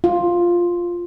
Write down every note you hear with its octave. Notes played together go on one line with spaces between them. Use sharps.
F4